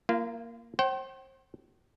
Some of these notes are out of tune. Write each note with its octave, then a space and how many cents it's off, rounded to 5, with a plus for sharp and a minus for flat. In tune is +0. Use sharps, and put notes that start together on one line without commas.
A#3 +0 F4 -40
C5 +35 G5 -40